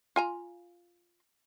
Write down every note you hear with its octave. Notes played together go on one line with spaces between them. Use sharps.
F4 G#5 A#5